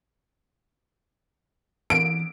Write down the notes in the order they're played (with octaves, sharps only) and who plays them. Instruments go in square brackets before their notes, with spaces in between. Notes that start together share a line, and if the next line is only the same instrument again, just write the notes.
[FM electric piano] E3 [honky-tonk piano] D7